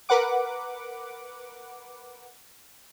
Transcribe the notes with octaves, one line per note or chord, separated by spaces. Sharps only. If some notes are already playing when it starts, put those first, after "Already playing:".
A#4 B4 F#5 D6